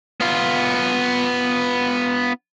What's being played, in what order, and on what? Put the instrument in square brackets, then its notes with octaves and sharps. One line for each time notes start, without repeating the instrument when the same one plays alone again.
[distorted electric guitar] B3 F4